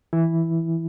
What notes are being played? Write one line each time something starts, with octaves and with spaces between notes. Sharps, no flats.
E3 E4